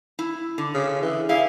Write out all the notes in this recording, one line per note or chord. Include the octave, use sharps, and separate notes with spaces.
E4
D3
C#3
E3
E4 G#4 F5